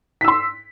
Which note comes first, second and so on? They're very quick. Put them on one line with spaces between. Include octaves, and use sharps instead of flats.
B6 E6 C6